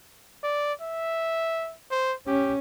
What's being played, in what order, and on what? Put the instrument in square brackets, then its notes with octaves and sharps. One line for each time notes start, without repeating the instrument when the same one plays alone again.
[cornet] D5
E5
C5
[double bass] C#4 [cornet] G4